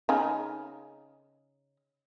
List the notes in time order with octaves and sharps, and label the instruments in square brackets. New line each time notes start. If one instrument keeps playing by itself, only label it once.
[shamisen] C#3 D#4 G#4